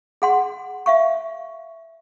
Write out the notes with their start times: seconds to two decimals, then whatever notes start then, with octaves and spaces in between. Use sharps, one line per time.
0.22 G#4 F#5 C6
0.86 E5 F5 C#6